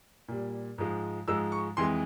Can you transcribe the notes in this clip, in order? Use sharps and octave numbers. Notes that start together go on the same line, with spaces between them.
A#2 G3
G#2 F3 G#3
G#2 F3 G#3 E6
C#6
F2 E3 G#3 C6